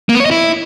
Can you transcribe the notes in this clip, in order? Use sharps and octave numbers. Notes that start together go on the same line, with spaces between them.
A#3
B3
C#5
D#5
E4